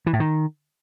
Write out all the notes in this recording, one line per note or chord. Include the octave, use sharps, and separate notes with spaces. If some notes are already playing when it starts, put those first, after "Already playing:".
E3
A2
D#3